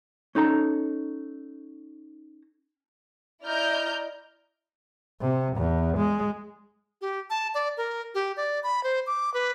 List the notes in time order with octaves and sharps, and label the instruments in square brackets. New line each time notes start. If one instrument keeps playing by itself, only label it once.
[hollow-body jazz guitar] C#4 D#4 A4 A#5
[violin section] E4 D5 D#5 A#5 F6 G6
[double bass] C3
E2
G#3
[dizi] G4
A5
D5
A#4
G4
D5
B5
C5
D6
B4